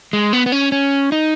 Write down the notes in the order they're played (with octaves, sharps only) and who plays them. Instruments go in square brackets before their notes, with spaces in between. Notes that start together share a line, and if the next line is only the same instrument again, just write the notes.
[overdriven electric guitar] G#3
B3
B3
C#4
C#4
D#4